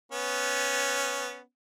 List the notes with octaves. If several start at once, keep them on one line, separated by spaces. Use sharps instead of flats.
B3 C#4